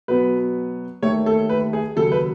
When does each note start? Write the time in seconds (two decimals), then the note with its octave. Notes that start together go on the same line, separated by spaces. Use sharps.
0.08 B2 F#3 B3 B4
1.02 D#2 D#3 A3 C#5
1.26 A4
1.49 B4
1.73 G#4
1.96 D#2 C#3 F#3 A4
2.12 B4